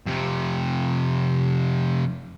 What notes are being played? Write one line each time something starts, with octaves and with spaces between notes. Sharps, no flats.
F2 C3